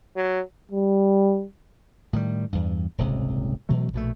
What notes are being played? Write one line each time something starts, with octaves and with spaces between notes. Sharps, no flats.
F#3
G3
A2 D#3 G3
E2 G2
D#1 G#1 C#2 C3
B2 E3 F#3 A3
A#1 B2 A3